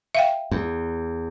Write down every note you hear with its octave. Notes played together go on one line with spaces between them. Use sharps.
E5 F5 G5
E2